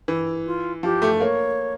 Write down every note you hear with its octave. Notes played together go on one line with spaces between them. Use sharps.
E3
F4
F3 G4
A3
A#3 C#5